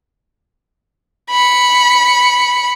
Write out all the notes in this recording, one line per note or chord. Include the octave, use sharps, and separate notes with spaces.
B5 C#7